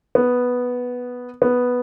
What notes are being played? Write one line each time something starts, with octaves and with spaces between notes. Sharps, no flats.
B3
B3